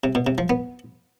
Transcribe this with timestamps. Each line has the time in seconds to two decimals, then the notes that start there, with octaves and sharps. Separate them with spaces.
0.04 C3
0.15 B2
0.27 C3
0.38 F3
0.50 B3